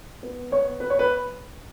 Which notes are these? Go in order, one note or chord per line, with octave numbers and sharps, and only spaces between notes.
B3
B3 C#5
B3 B4
C#5
B4